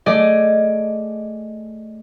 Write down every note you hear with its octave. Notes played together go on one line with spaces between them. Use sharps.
A3 G#4 D5 D#5